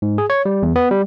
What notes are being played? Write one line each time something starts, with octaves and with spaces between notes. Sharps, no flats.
G#2
G#4
C#5
G3
E2
B3
G3